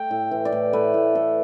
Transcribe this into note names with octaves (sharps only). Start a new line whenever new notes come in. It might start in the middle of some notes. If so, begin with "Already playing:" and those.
Already playing: A3 G5
A2
E3
D5
A2
A3 B4
A2
E3 A4